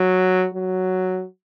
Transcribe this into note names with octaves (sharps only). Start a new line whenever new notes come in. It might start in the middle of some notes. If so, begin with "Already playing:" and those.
Already playing: F#3
F#3